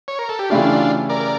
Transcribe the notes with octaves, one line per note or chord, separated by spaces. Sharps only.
C#5
A#4
A4
G4
C#3 E3 A3 D4 E4 F4 G4
A#4 D5